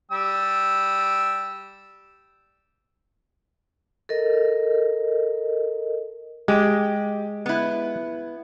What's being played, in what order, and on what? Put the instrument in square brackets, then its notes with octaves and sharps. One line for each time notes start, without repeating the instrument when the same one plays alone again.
[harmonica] G3 G5 E6
[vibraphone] A4 A#4 D#5
[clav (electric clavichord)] G#3 [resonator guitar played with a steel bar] G4
[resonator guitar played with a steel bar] B3 E4